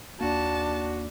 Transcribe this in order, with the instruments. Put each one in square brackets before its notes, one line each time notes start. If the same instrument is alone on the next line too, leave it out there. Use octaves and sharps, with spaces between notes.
[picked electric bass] D#2 A#3 [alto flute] D4 [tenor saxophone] F#4 [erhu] A5